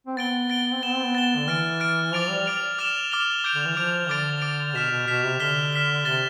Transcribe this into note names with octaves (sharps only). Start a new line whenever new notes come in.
C4
B3 A6 D7 G7
A6 D7 G7
C4
B3 A6 E7 G7
C4
B3
A6 E7 G7
D3
E3 F6 A6 D7
F6 A6 D7
F3 D6 A6 D7 F7
G3
D6 A6 D7 F7
D6 F6 A6 E7 G7
D6 F6 A6 E7 G7
D6 G6 D7 F7
D3
E3
F3 D6 G6 D7 F7
D3 D6 A6 D7
D6 A6 D7
B2 F6 B6 E7
B2
B2 F6 B6 E7
C3
D3 F6 B6 E7 G7
F6 B6 E7 G7
C3 F6 A6 E7 G7